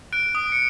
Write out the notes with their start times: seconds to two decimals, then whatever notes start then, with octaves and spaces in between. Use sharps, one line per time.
0.13 F#6 D7
0.35 D#6
0.52 C#7